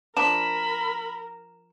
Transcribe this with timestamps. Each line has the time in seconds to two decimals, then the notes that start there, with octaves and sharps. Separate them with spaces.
0.17 F3 D4 A#4 B5 E7